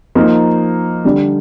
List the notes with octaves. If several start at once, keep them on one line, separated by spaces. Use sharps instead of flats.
F3 A#3 D#4
D3 G3 D4